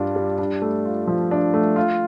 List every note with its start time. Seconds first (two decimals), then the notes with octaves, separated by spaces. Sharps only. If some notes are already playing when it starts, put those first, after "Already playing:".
Already playing: G2 G3 D4 F4
0.16 G3
0.38 D4
0.62 A3
0.86 F4
1.07 F3
1.31 D4
1.54 A3
1.76 F4